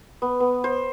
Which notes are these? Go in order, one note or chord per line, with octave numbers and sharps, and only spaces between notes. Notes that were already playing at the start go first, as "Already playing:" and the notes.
B3
B3
C5